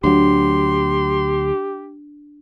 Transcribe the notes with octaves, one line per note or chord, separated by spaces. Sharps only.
D2 F#3 D4 G4 C6